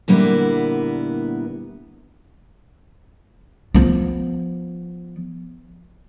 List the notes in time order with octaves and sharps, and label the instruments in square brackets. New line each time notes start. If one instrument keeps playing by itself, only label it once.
[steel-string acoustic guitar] A#2 D3 G3 A#3 B3 E4
[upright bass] F3 B3